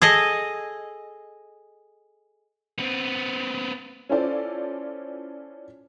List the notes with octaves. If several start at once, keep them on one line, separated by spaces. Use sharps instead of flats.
G#4 A4 D#5
B3 C4
C#4 E4 F4 A4 C5 D5